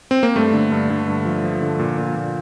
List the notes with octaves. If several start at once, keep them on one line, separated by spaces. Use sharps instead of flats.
C4
A#3
G2 A3
D3
G2
D3
G2
F3
F3
D3
A#2
A#2
A#2